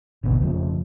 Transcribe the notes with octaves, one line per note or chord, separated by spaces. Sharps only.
G#1 D2 B2 B3
F2 C#3 F3 A3